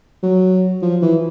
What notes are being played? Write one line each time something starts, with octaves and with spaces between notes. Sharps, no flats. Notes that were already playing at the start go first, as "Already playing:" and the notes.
F#3
F3
E3